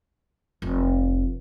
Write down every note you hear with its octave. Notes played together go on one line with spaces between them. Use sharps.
F1